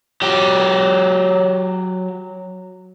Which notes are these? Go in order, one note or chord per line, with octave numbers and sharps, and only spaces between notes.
F#3 G4